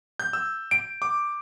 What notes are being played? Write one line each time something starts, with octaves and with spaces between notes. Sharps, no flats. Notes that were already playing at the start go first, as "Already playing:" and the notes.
G6
E6
D7
D6